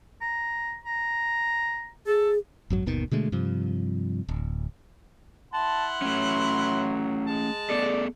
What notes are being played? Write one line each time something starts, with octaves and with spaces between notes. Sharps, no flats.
A#5
A#5
G#4 A4
G#1 F#2 F#3
G1 D#2 B2 D#3
B2 D3 G#3 A3
G2 C3 F3
D1
E4 F#5 A5 C6
F#3 A3 C#4
G#3 A5
B3 G#4 A4 D5